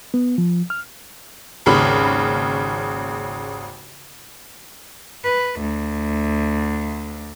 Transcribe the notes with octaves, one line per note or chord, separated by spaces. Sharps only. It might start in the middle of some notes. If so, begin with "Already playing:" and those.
B3
F3
F6
G#1 D#2 C#3 B5
B4
D2